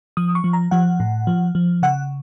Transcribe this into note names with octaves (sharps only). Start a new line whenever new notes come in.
F3 D#6
C#6
F3
A#5
F3 F#5
A2
F3
F3
C#3 F#5